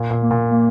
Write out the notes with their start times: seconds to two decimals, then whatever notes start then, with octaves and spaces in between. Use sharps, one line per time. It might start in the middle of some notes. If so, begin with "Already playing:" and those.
Already playing: A#2
0.11 A#2
0.22 A#3
0.31 A#2
0.51 A#3